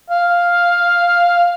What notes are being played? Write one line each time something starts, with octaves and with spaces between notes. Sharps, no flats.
F5